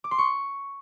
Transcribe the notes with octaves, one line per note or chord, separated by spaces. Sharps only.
D6
C6
C#6